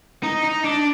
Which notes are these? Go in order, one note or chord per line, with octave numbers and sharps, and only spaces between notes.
D#4
D#4
D4